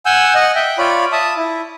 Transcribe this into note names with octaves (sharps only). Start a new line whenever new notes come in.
F#5 G#5 E6 G6
D#5 F#5
E5 G5
F4 C#5 D5 B5
E5 A5 D#6
E4